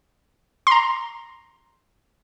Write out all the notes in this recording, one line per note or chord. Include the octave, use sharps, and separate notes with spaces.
A#5 C6